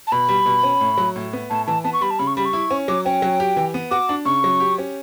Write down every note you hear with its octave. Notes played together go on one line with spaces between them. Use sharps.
A5
B2 B5
G3
B2
C#4
A2
F#3
A2
B3
A2 A5
E3 A5
B3 A5
C#6
G3 B5
A5
C#3 B5
C#6
G3 B5
C#6
E4
C#4
F#3 D6
C#4 G5
F#3
G4
E3
B3
F#4 D6
D4
C#3 C#6
F#3
G4
C#4